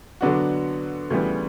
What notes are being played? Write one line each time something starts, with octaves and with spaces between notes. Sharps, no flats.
D3 F#3 B3 D4 F#4
D2 C#3 E3 G3 B3